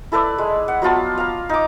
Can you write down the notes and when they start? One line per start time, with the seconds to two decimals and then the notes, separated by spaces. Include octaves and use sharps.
0.12 E4 A4 B4 D5
0.38 G#3
0.68 F#5
0.82 F#3 B3 F4 A5
1.18 F5 A#5
1.49 D#4 D6